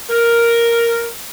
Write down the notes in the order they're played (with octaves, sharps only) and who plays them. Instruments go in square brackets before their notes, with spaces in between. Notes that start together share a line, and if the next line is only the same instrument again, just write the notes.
[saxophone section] A#4